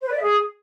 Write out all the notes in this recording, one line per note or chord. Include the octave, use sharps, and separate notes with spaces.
C5
B4
D5
E5
G#4